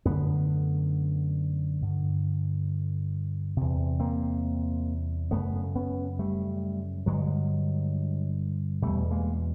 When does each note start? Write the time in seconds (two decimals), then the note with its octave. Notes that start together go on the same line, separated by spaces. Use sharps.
0.05 F#2 D3 A3 B3
1.82 G2 D3
3.57 E2 C3
4.00 A#3 C4
5.31 F#2 C#3 A3 B3
5.76 B3 C#4
6.19 G3 A3
7.06 G2 D3 F#3 G#3
8.82 E2 B2 G3 A3
9.11 G#3 A#3